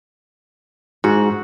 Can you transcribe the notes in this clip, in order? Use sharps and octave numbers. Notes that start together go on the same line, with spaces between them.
G#2 F#4